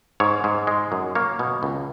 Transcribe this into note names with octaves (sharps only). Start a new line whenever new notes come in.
G#2 C#5
G#2
G#3
F#2
A#3 C#5
B2
C#2